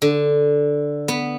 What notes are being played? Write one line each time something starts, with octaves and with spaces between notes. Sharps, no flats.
D3
B3